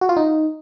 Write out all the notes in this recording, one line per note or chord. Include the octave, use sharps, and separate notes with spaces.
F#4
F4
D#4